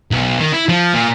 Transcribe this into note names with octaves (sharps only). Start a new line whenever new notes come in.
B1
D#3
E4
F3
A#2